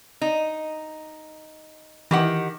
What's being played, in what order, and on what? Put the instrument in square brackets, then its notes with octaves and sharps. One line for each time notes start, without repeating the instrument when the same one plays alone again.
[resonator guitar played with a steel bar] D#4
[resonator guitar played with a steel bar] D#3 G4 F#5 [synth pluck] E3